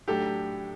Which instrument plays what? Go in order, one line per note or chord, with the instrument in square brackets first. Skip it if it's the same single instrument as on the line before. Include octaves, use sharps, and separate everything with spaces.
[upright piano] A2 F#3 A3 D4 [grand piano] G4 A4